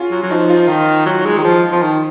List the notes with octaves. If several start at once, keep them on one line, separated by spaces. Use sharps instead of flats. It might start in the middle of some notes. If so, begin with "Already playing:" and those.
Already playing: C#4 F4 F#4 G#4
F#3
F#3
F3 D#4
F4
D#4
D#3
F#3
G#3
D#3
F3
F3
D#3